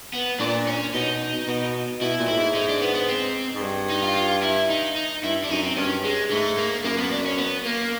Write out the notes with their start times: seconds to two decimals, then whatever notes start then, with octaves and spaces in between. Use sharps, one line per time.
0.13 B3
0.40 A#2 D4
0.67 C#4
0.94 B2 D#4
1.47 B2
2.01 B2 E4
2.19 A#2
2.28 A2 E4
2.37 G#2
2.55 D#4
2.69 D4
2.82 B3
2.95 B3
3.08 C4
3.55 G#2
3.62 G2
3.90 D#4
4.03 F4
4.16 F4
4.42 E4
4.70 D#4
4.96 D#4
5.23 G2 E4
5.44 D4
5.50 F#2 D#4
5.63 C4
5.77 G2 C#4
6.04 G#3
6.31 G#2 A3
6.57 A#3
6.84 F#2 A#3
6.98 B3
7.12 D4
7.26 C#4
7.39 B3
7.66 A#3